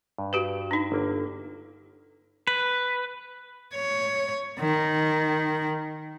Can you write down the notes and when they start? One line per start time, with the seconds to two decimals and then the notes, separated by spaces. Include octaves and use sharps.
0.18 G2
0.33 F#4 G4 B4
0.71 D4 D#4
0.92 G1 A#3
2.47 B4
3.74 C#5
4.59 D#3